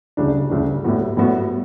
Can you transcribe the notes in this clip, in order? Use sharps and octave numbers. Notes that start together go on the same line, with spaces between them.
D2 C#3 G3 D4
D2 C#3 G3 D4
A2 G3 B3 F#4
A2 G3 B3 F#4